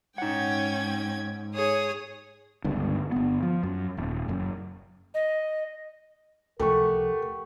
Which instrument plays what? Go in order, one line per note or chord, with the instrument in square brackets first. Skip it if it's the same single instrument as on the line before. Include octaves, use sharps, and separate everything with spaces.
[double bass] G#2 [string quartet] C#4 G5 G#6 [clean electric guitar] D#4 F#5
[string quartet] G#4 C#5 D#6
[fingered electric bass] G1 C#2 G2
G1 B3
F3
F#2
D#1
F#1 F#2
[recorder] D#5
[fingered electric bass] C#2 C3 F3 [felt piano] A3 [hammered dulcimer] G4 F#5 C#6 [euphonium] A#4